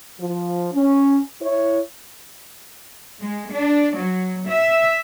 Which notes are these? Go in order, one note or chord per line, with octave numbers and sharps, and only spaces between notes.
F3
C#4
E4 C#5
G#3
D4
F#3
E5